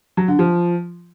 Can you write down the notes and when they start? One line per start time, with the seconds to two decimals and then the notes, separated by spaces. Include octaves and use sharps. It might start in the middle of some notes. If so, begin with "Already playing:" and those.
0.17 F#3
0.28 D3
0.39 F3